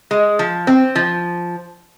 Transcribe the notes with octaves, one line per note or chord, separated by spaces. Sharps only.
G#3
F3
C4
F3